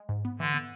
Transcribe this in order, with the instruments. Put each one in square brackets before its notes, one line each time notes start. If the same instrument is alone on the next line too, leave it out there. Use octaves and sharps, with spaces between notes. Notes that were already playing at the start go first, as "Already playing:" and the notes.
Already playing: [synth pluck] G#3
G#2
B3
[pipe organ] D3 [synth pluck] E3
[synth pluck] B3